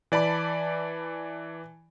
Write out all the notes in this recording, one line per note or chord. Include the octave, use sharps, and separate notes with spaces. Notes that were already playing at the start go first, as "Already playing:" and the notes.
E3 D5 A5 B5